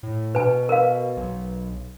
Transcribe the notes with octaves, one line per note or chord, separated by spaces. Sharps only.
A2
B2 B4 G#5
A#4 B4 F5
B1